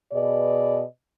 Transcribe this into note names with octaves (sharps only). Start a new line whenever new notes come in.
B2 G#4 B4 D5 D#5